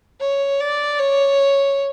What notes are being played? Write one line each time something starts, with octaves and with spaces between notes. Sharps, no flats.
C#5
D5
C#5